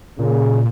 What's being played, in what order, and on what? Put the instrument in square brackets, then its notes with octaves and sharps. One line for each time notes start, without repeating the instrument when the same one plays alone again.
[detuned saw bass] A#2 [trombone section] C#3